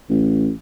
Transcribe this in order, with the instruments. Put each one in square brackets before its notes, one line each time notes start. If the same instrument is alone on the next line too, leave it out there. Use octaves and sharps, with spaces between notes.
[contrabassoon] A1